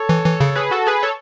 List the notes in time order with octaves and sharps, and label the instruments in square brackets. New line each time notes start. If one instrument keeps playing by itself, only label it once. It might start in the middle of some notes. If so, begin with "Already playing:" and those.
Already playing: [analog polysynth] A4 C#5
[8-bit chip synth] E3
E3
C#3
[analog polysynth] G#4 B4
F#4 A4
G#4 B4
A4 C#5